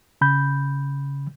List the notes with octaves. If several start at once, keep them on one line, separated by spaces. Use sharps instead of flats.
C#3 B5 G6